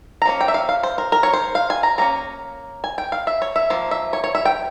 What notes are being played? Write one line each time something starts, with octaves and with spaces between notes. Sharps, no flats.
A#5
F3 A#3 C#4
G5
E5
F5
F5
C5
A#4
A#4
C#5
C5
F5
G#5
A#5
F3 A#3 C#4 A#5
G#5
G5
F5
E5
C#5
E5
F3 A#3
E5
C#5
C#5
E5
G5